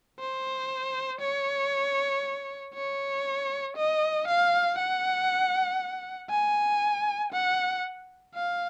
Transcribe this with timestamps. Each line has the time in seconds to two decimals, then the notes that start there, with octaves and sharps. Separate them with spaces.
0.20 C5
1.21 C#5
2.74 C#5
3.77 D#5
4.27 F5
4.79 F#5
6.30 G#5
7.32 F#5
8.34 F5